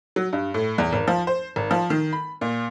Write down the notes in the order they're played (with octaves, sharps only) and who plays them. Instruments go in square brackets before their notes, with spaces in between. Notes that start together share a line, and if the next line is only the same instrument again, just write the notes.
[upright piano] F#3
G2
A2
E2
G#1
F3
C5
G#1
F3
D#3
B5
A#2